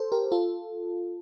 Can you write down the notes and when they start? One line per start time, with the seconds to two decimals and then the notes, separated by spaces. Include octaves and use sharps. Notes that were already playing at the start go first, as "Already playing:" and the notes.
Already playing: A4 C5
0.12 G4 A#4
0.32 F4 A4